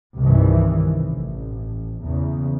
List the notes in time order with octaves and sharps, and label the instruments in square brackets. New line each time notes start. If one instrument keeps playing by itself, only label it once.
[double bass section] C2 G2 C3 D#3 E3
A1
E2 C#3